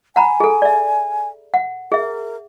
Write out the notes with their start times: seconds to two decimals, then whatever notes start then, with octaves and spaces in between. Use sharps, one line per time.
0.16 F#5 G#5 A#5 B5
0.40 G#4 A4
0.62 D5 E5
1.54 F#5
1.92 G#4 A#4 E5